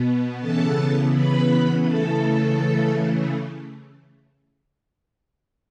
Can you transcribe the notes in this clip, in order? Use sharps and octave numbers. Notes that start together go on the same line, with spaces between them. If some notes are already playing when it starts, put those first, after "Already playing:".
Already playing: B2 B3
C#3 E3 B3 A4 A5
B4 B5
C#3 E3 A3 A4 A5